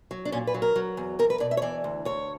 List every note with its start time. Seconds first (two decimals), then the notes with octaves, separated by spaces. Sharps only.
0.11 F#3
0.25 D4
0.32 A#2 C#4
0.47 B4
0.54 F#3
0.62 A#4
0.76 F#3
0.97 E2
1.19 E2 A#4
1.30 B4
1.40 B2 D5
1.51 E5
1.57 C#5
1.62 E3 D5
1.84 D2
2.05 D2 C#5